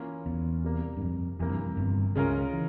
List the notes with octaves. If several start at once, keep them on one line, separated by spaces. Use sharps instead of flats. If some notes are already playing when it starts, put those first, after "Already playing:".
Already playing: E3 A#3 C#4 F4
E2
C3 G3 A#3
G2
F2
F2 C3 E3 A#3
G2
F2
G1 G2
C#2 C#3 G#3 C#4 F4 A#4
E3